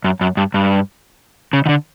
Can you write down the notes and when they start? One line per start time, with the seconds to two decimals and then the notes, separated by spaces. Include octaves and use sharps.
0.04 F#2
0.21 F#2
0.37 G2
0.54 G2
1.53 C#3
1.66 D#3
1.69 D3